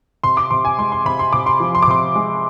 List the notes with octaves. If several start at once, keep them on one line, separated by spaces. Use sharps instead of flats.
C3 C6
D6
C3 C6
G#5
G#3 C6
C6
C3 B5
C6
C3 D6
C6
F3
C6
D6
C3 C6
G#3